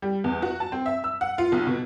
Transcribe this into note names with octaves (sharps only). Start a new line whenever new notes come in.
G3
E2
F#4
A5
C4
E5
E6
F#5
F4
B1
B2